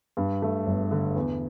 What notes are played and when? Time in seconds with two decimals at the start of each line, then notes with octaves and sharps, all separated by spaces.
0.17 G2
0.42 A3
0.67 G1
0.91 D3
1.16 E2